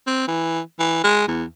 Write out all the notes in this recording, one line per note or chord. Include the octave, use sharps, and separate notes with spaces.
C4
E3
E3
G#3
E2